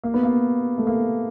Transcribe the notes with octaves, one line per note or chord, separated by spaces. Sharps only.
A#3
B3
A#3
A3
A#3